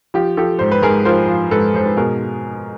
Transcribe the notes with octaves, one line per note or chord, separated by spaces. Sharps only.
F3 G4
F3 G4 A4
G#2 C5
B4
G#2 G#4 A#4
F3 A#4 C5
F3
G#2 A4 B4
G#2 C5
B4
B2 G#4 A#4